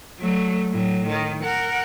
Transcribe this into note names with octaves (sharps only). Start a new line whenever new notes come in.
F#3 A3
A2 F#3
D#3
A#4 F#5